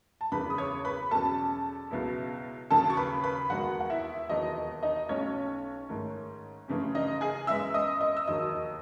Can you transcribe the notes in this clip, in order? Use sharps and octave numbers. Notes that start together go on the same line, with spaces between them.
A5
F#1 E2 C#3 B4 B5
D#6
C#5 C#6
B4 B5
E2 B2 F#3 C#4 A4 A5
C#2 B2 F#3 B3 E4
D#2 C#3 F#3 A4 A5
C#6
B4 B5
B4 B5
E1 D#2 D#3 G#3 B3 F#4 F#5
F#5
E4 E5
E1 D#2 D#3 F#3 B3 D#4 D#5
D#4 D#5
B1 B2 A3 C#4 C#5
G#2 D#3 A3
F#2 C#3 E3 A3 C#4
D#4 D#5
G#4 G#5
F#2 E3 G#3 B3 E5 E6
D#5 D#6
D#5 D#6
E6
E1 D#2 D#3 F#3 D#5 D#6